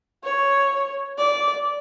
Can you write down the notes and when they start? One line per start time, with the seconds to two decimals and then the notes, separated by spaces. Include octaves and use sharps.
0.24 C#5
1.18 D5